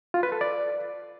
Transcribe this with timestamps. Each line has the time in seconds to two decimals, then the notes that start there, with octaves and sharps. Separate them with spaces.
0.14 F4
0.23 B4
0.32 A4
0.41 D5